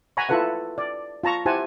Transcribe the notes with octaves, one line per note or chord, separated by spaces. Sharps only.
F#5 G#5 A#5 B5 C#6
E4 F4 A4 B4 F#5
D5
F4 A5 A#5 C#6
E4 G4 C5 F#5 G#5 A5